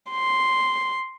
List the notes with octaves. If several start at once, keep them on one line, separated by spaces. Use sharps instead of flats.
C6